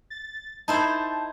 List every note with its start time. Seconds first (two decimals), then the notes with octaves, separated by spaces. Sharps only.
0.10 A6
0.68 D#4 E4 C5 A5